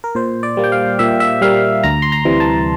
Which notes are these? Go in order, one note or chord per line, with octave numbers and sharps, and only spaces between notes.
A#4
A#2 C5
D5
G3 A#3
G5
F5
A#2 E5
E5
G3 A#3 F5
D2 A#5
C6
A#5
C3 E3 G3
A5